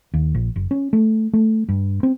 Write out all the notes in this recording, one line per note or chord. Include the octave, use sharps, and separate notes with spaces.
D#2
A#1
F#1
C#4
A3
A3
G2
C4